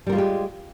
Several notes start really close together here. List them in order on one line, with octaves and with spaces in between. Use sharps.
G3 A#4 F4 G#3 G4